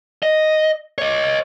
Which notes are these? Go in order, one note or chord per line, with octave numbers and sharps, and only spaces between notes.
D#5
C#5 D#5